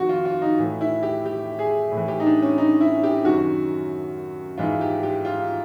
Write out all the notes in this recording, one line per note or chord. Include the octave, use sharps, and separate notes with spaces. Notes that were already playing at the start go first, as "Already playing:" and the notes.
Already playing: F2 C3 D#3 F#4
F4
F4
D#4
A2 E3
E4
G4
G4
G#4
A2
E3
G4
D#4
D4
C#4
D#4
E4
G4
F#2 D#3 F#4
G#2 E3 F4
G4
G4
F4